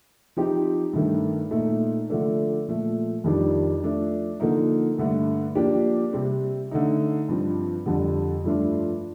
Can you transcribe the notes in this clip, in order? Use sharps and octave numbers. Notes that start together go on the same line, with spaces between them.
F3 C4 D#4 G4
G2 D#3 A3
A#2 A3 D#4
D3 F3 A3 D4 A4
A#2 F3 A3
F2 D#3 G3 D4 F4
F3 A3 D4
D3 F3 A#3 D#4 A4
G2 D3 A3
F3 A#3 D4 G4
C3 G3 C4
D3 A3 D#4
G2 F3 C4
F2 D3 G3
G2 F3 A3 D4 F4